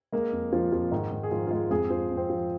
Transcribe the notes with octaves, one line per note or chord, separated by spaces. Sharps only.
G#3 A#3 A#4
F2
F2 F3 F4
F2 F3 F4
G#2 D#3 D#4
G#2
G#4
G#2 F3 F4
F4
G#3 G#4
F2 G#3 G#4
F3 C5
F2
C4 C5
F3